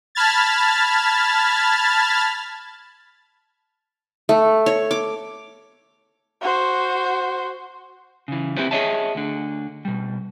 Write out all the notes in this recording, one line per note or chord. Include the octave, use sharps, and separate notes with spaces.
A5 B5 F6 G#6 A6
A3
C#5
D6
F#4 C5
C#3 E3
C4 E4 G4 B4 C5
G#4 B4 C#5 D#5 E5 A5
D2 D3
B2 G3